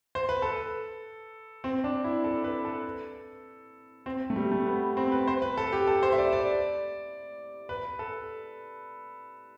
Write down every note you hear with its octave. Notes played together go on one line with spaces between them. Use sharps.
C5
B4
A4
C4
D4
E4
A4
B4
A4
C4
A3
G3
A3
B3
C4
B4
C5
B4
A4
G4
A4
C5
E5
D5
D5
B4
A4